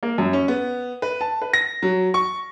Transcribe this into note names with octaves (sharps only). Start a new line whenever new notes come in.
A#3
F#2
C#4
B3
B4
A5
B4
A#6
F#3
C#6